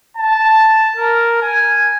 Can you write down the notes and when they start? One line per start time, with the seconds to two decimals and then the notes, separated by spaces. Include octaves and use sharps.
0.17 A5
0.97 A#4
1.42 G#5